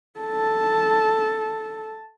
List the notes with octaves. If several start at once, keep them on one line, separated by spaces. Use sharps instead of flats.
A4 A5